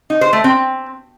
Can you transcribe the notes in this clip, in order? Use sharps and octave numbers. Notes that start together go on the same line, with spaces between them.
D#4
C5
A3
C4